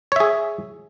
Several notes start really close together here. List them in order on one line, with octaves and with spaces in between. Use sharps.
C#5 E5 G#4